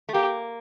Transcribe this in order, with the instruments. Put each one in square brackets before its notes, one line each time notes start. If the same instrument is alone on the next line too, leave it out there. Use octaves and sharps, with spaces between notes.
[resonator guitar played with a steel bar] A3
[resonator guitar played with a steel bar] A#3 [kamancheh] G4